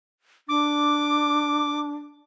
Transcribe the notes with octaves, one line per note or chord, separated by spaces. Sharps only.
D4 D6